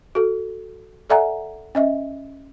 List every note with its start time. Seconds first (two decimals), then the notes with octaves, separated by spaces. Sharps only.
0.15 F#4 A4
1.10 A4 D5 E5 F#5 G#5 A#5
1.75 C#4 D#5 E5